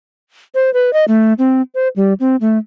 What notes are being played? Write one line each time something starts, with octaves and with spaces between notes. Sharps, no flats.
C5
B4
D#5
A3
C4
C5
G3
C4
A3